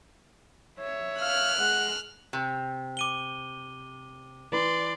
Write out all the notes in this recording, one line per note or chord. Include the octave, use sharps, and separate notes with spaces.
C#5 E5
F5 F6 F#6
G#3 F#5
C3
D6 D#7 G7
E3 B4 D5 C6